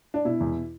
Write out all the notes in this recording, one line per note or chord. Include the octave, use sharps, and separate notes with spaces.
D4
B2 E4
E2